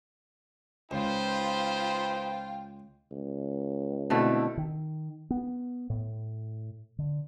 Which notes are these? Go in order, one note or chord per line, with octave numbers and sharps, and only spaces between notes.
C#2 D#4 F4 B4 C5 G5
C#2
B2 D3 A3 C4 E4
D#3
B3
A2
D3